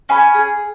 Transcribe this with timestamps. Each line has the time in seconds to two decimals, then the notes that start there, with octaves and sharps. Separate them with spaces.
0.09 C#4 G#5 B5
0.34 G#4